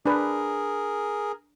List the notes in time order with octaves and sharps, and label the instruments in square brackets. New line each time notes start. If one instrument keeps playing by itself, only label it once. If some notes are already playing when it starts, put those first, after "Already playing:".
[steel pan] D4 B4 [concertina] G#4 A#4